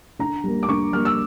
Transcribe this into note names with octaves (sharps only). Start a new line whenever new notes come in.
D3 A#5
G3 A#3
D6
D3 C#6
G3 A#3 F6
E6